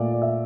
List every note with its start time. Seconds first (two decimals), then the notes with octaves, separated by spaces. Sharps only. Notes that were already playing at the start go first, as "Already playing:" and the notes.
Already playing: A#2 A3 D5
0.13 D5
0.22 E5